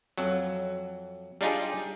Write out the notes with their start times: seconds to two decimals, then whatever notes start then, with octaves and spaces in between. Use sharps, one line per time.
0.18 F2 F#3
1.41 G3 D4 D#4 F4 G4 G#4